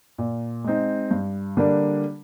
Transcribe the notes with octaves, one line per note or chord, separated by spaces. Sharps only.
A#2
G#3 C4 D#4
G2
D3 G3 A#3 D4